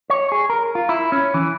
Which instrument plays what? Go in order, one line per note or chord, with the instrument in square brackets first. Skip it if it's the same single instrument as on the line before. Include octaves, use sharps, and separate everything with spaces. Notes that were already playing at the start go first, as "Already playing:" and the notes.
[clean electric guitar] C#5
G#4
A#4
F4
E4
C#4
E3